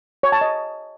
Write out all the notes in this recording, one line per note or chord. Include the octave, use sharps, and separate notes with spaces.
C#5
A5
D#5